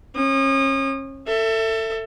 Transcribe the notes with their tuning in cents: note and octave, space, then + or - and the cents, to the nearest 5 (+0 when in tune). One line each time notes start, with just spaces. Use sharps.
C#4 -35 D#6 -30
A4 +25 E5 +5